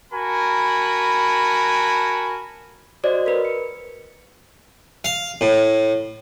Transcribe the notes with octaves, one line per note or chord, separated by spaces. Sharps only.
F#4 A#4 G#5 A5 B5
F#4 C5 D5 D#5
A#4 B4
C#7
F5
A2